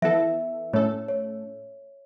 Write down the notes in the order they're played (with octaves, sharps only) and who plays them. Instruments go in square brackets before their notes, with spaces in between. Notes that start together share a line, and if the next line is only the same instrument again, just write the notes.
[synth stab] E3 B3 E4 A4 [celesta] E5
[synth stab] A2 A3 C#4 A4 [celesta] C#5
[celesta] C#5